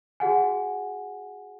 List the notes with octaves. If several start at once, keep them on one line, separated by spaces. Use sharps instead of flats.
F#4 G#4 F#5 G#5